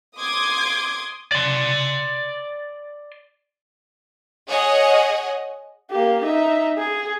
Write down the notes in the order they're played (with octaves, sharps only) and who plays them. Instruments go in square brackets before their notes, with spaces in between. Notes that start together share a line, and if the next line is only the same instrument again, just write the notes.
[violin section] C6 D6 D#6 G#6
[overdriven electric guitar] D5 C6
[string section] G#4 C#5 D#5 F#5 G#5
[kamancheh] A#3 G4
D#4 E5
G#4